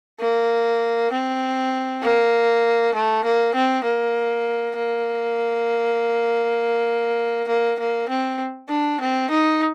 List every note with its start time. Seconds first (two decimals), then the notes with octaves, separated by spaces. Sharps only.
0.20 A#3
1.12 C4
2.02 A#3
2.94 A3
3.24 A#3
3.55 C4
3.84 A#3
4.76 A#3
7.48 A#3
7.79 A#3
8.09 C4
8.69 D4
9.00 C4
9.31 D#4